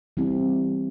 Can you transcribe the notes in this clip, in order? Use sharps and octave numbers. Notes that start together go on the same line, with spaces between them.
E3 G3 C4 E4 G4